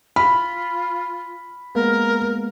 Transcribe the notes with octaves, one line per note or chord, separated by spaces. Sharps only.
F4 B5 F6
G#3 A#3 B3 A#4